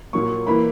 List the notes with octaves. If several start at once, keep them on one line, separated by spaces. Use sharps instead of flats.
A#2 F#3 A#3 C#6
E3 A#3 B5